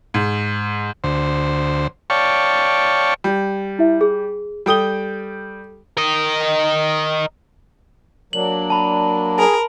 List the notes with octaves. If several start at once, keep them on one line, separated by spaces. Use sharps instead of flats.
G#2
D2 C5
C#5 D5 F5 G5 A5 C#6
G3
E4 E5
G#4
G3 G4 A4 G5 D#6 G7
A#4 D#5
F#3 A#3 D4 F#7
A5 B5
G#4 A#4